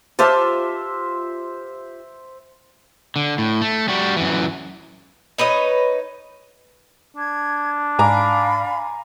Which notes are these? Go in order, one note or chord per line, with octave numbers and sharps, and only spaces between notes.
F4 G4 C5 E5 A5
D3
A2
A3
G3 F#4
F#2 E3
D#4 B4 C#5 D#5
D4 G#6
G#2 D5 F5 G#5 A#5 B5 D6